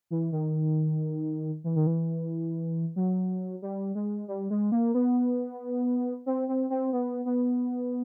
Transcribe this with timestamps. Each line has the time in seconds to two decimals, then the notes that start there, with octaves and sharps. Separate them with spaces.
0.10 E3
0.32 D#3
1.64 E3
1.76 D#3
1.87 E3
2.96 F#3
3.62 G3
3.95 G#3
4.28 G3
4.50 G#3
4.72 A#3
4.94 B3
6.26 C4
6.49 C4
6.70 C4
6.93 B3
7.25 B3